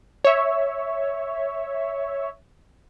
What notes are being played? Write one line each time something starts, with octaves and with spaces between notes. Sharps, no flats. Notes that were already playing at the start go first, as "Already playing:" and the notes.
C#5 E5